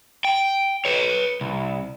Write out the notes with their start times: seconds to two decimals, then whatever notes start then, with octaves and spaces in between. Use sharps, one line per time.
0.25 G5
0.85 B4 C#5
1.41 C2